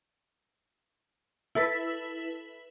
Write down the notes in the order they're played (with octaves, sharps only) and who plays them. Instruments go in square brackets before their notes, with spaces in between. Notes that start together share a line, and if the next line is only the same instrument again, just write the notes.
[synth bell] E4 A4 B4